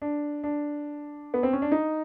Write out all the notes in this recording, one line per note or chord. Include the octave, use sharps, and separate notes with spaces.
D4
D4
B3
C4
C#4
D4
D#4